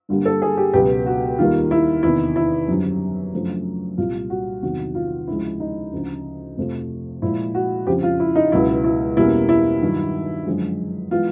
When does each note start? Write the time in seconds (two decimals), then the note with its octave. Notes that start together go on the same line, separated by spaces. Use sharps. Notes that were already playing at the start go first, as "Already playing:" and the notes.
0.09 G2 D3 G3 A#3
0.25 A4
0.42 G#4
0.57 G4
0.73 C#2 B2 F#3 B3 G4
1.06 F#4
1.38 D#2 D#3 G3 A#3 F4
1.71 E4
2.03 E2 C3 D#3 E4
2.36 E4
2.68 F#2 D3 G3 C4
3.33 F#2 C#3 F3 A3 D4
3.98 C2 A#2 G3 F4
4.30 F#4
4.63 E2 C3 D#3 F#3 F#4
4.95 F4
5.27 D2 C#3 F3 G#3 E4
5.60 D#4
5.93 D2 C#3 F3
6.57 F2 C3 F3 A3
7.22 A#2 F3 G#3 E4
7.55 F#4
7.87 F2 C#3 F3 G4
8.03 F4
8.20 E4
8.36 D#4
8.52 C#2 B2 F#3 B3 E4
8.84 E4
9.16 E2 B2 G3 A#3 C#4 E4
9.49 E4
9.81 G2 D#3 F#3
10.46 F#2 D3 F3 G#3
11.11 E3 G#3 B3 F4